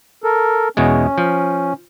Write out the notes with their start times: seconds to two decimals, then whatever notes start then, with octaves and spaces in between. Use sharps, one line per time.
0.24 A4 A#4
0.77 E2 B2 G#3 C#4
1.18 F3